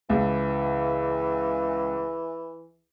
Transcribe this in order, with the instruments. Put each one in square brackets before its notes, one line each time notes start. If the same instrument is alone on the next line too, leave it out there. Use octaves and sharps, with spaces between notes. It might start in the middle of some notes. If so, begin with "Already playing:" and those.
[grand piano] C#2 [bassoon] E3